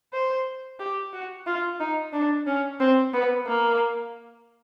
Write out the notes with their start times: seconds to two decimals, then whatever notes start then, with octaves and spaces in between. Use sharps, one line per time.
0.13 C5
0.79 G4
1.13 F#4
1.46 F4
1.80 D#4
2.13 D4
2.47 C#4
2.80 C4
3.13 B3
3.47 A#3